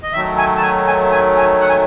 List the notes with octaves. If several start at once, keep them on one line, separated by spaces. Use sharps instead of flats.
D#5
D#3 F#3 A3 E5
G#5
A5
G#5
G#5
G#5
G#5
F#5
G#5